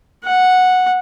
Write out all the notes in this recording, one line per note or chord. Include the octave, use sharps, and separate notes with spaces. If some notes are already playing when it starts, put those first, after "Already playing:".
F#5